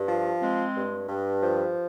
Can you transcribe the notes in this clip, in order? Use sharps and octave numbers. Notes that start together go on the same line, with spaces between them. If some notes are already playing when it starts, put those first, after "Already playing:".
Already playing: G2
F3
G#3 C4
G2
G2
F3